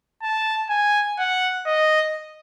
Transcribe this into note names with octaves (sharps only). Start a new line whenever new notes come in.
A5
G#5
F#5
D#5